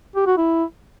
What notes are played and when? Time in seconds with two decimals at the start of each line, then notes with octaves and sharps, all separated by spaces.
0.16 G4
0.27 F#4
0.37 E4